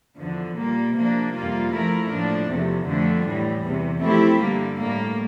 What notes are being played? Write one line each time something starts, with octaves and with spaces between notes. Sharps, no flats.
E2 D3 F3
A#2 G3 A#3
C3 F3 A#3 D4
F2 C3 G3 A#3 F4
F3 A3 E4 A#4
A2 F3 A#3 D4
E2 C3 F3 A3
F2 D3 F3 A3 D4
A2 E3 G3
E2 C3 E3
F3 A3 C4 E4 G4
G2 D3 G3 A#3
A2 G3 A#3